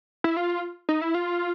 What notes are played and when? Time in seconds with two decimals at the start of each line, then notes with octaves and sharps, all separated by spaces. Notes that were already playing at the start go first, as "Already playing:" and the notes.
0.24 E4
0.37 F4
0.89 D#4
1.01 E4
1.15 F4